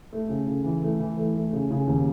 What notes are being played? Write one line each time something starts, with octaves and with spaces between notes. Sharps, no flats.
A3
C#3
C#3
E3
A3
E3
A3
A3
C#3
C#3
D#2